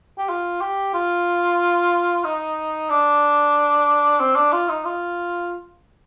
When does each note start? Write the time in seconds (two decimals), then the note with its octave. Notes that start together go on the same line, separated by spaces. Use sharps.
0.18 G4
0.29 F4
0.62 G4
0.94 F4
2.24 D#4
2.90 D4
4.20 C4
4.36 D4
4.52 F4
4.69 D#4
4.85 F4